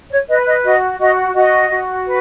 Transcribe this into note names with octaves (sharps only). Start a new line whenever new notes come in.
C#5
B4 D#5
D#5
F#4 D#5
F#4 D#5
F#4 D#5
F#4
B4